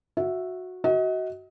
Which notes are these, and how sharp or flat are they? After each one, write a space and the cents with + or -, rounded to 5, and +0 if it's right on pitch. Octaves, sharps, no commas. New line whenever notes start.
F#4 -15 E5 +0
F#4 +15 D#5 +35